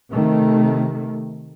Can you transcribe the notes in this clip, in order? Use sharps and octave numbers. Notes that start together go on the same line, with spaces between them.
C3 D#3 A3